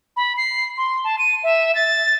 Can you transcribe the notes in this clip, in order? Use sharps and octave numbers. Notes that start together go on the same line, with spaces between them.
B5
C7
C6
A5
D#7
E5
A6